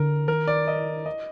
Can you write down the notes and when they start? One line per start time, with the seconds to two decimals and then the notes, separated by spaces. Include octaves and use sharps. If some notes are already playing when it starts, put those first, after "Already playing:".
Already playing: D3 A#4
0.28 D#3 A#4
0.48 D5
0.67 D#5
1.06 D#5